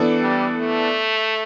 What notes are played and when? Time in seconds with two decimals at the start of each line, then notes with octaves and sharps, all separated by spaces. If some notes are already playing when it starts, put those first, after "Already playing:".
Already playing: E3 B3 D4 A4
0.21 G3
0.57 A3